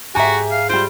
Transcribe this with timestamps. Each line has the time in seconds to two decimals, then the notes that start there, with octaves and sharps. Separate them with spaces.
0.15 G#2 F#4 G4 E5 G#5 A#5
0.51 F5
0.70 G3 F4 C5 D7